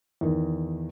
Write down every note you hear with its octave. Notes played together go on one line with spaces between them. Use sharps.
E2 D#3